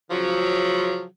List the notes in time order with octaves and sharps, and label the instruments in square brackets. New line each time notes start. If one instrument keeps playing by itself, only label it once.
[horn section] C#3 F3 F#3